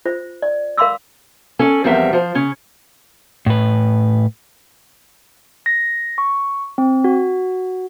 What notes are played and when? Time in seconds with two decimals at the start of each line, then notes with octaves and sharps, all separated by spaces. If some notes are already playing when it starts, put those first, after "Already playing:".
0.05 F4 C5
0.42 D5
0.77 A#4 F5 B5 C6 D6 E6
1.59 C#4 A4 D5 G#5
1.84 E2 F3 G3 C4 A#4 E5
2.13 F3 C5
2.35 C#3 C#4
3.46 A2 B4
5.66 A#6
6.18 C#6
6.78 C4
7.04 F#4